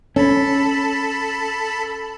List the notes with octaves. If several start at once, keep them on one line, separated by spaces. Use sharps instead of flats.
C#4 A4 A5 B5